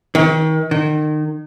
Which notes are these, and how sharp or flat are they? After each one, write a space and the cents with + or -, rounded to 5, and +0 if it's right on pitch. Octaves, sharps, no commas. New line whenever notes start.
D#3 +30
D#3 -30